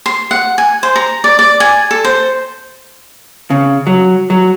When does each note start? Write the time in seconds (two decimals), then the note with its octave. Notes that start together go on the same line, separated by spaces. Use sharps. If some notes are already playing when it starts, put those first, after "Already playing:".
0.06 C6
0.31 F#5
0.58 G#5
0.83 C5
0.96 A#5
1.24 D5
1.39 D5
1.60 G#5
1.91 A4
2.05 C5
3.50 C#3
3.87 F#3
4.30 F#3